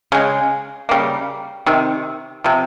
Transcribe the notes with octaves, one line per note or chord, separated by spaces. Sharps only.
C#3 G#3
C#3 G3 A#3
C3 D#3
C3 F3